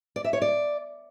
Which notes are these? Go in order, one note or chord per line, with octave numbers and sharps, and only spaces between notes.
D5
E5
C#5
D5